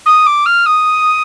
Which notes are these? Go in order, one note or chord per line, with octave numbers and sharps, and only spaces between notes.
D#6
D6
F6
D#6